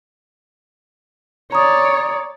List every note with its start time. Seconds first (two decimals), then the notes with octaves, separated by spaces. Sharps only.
1.52 C#5 D5 A#5 D#6